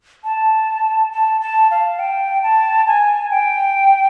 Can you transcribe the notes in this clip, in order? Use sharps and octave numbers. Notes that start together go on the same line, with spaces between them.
A5
A5
A5
F5
G5
A5
G#5
G5